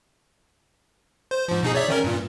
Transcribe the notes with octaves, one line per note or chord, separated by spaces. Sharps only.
C5
G#2 F3
B2 D#4 G#4
C#5 D5 E5
D#3 C#4 A#4
G2 A#2